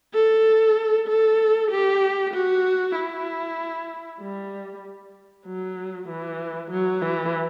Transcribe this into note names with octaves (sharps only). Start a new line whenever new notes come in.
A4
A4
G4
F#4
E4
G3
F#3
E3
F#3
E3